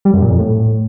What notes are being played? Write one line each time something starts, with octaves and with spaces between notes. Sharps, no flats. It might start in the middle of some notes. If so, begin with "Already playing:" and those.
G3
F#2
A#2
F2
A2